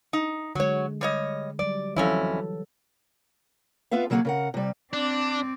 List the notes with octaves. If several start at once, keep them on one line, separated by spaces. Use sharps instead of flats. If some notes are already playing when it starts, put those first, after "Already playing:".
D#4
D3 F#3 G#3 C#5
G3 C#5 D#5
F#3 G3 D5
F2 E3 F#3 C#4 E4 A4
B3 F4 B4 E5 F5
C#3 F#3 A#3 B3 F#4 G#4
C#3 A#4 F#5
C3 G3
C4 D4 D5